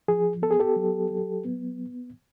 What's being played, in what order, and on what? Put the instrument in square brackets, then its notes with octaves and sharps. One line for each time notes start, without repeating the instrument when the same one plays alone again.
[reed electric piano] F3 G#4
B3 A4
G#4
G4 A4
F#3
F#3
B3